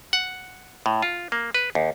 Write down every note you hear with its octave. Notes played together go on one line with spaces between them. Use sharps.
F#5
A2
F4
A#3
B4
D#2